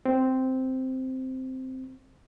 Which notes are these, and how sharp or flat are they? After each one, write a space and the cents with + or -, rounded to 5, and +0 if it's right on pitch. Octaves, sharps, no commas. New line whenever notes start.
C4 -5